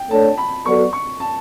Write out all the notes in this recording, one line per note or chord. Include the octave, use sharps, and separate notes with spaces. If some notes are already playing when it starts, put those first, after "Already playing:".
Already playing: G5
A3 D4 A4 C#5 A5
B5
F#3 B3 F#4 A4 D5 C#6
C#6
A5